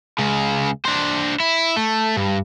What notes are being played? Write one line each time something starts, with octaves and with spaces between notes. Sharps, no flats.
C#2 C#3
D4 C5
E4
A3
G2